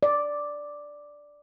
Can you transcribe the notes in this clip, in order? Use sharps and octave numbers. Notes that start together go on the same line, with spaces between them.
D5